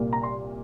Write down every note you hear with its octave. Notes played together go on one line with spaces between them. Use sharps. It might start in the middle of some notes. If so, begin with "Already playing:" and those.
Already playing: C2 A#2 A#3
A#5
C6